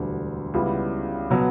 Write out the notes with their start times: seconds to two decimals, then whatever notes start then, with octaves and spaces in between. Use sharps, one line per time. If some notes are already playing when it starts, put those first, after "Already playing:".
Already playing: E1 D2 D3 G3
0.54 C#2 C#3 G3 B3 E4
1.31 B2 F#3 B3